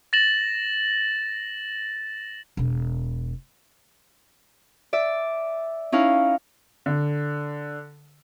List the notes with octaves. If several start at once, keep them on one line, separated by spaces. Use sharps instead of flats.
A6 A#6 E7 F#7
E1 B2
D5 E5
C#4 D#4 E4 F5
D3